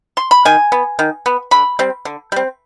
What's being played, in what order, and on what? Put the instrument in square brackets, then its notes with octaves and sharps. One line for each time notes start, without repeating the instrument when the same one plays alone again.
[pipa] C6
B5
D#3 G#5
B3
D#3
B3
D3 B5
G3 C4
D3
G3 C4